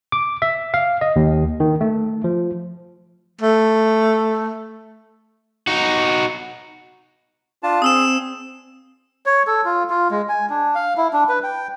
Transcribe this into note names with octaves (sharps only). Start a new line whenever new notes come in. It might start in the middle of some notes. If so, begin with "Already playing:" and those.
D6
E5
F5
D#5
D#2
D#3
A3
F3
A3
D#4 F#4
D4 F4 A5
C4 G#4 D#6 E6 E7
C#5
A4
F4
F4
G#3
G#5
D4
F5
E4
D4
B4
G5